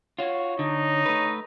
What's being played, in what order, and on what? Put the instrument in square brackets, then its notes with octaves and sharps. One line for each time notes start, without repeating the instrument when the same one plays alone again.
[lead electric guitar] F4 F#4 [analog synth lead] C#5
[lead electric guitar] D3 [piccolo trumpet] D#4
[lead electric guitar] A3 B4